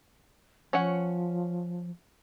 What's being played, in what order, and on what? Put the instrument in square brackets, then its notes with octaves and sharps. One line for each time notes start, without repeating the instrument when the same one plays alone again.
[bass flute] F3 [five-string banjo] C#4 C#5 F#5